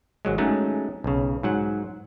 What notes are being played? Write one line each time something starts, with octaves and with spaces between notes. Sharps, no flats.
G#1 F#3 G#3
F#3 G#3 A3 C#4 D#4 G#4
B1 C#3
G#2 F#3 F#5